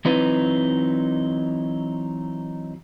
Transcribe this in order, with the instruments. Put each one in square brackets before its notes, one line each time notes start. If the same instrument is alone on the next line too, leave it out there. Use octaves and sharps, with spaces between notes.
[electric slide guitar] E3 F#3 C4 D#4 E4 B4